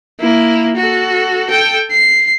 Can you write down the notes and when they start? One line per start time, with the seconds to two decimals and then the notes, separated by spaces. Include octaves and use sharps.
0.20 A#3 E4
0.76 F#4 A4
1.50 A4 G5
1.91 C7